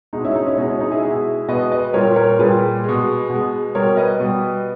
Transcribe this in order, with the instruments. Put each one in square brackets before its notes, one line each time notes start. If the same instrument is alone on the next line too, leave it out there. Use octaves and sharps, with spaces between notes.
[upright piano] B2 G#3 D#4
C#4 E4
D#4
C#4 E4
B2 G#3 C#4
C#4
D#4
E4 G#4
B2 G#3 E4 G#4
B2 G#3 B4 D#5
B4 D#5
A#2 G3 A#4 C#5
A#4 C#5
A#2 G3 G#4 B4
B2 G#3
B2 G#3
B2 G3 A#4 C#5
B4 D#5
B2 G3